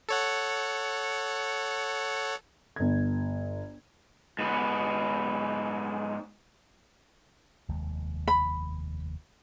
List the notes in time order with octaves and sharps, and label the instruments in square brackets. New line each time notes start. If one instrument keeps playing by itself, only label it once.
[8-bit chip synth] A4 C#5 F#5
[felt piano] G1 G#6
[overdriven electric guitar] G#2 B3
[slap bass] F1 D#2 G#3
[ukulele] B5